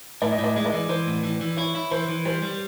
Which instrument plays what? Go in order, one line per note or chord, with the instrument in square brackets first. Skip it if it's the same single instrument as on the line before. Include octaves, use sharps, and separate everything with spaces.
[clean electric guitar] A2 [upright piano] D5
[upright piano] D#5
[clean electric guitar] A2
[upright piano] D5
[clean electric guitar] G#3 [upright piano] D#5
[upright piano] D5
[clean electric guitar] E3
[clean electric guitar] E3 [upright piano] C5
[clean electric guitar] A2
E3
E3
[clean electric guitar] E4 [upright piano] C#5
[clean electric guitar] E4
[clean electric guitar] E3 [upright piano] C5
[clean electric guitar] E3
[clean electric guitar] G3 [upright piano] C5
[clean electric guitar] G3